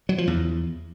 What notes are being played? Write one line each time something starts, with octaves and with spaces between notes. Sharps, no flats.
F#3
F3
E2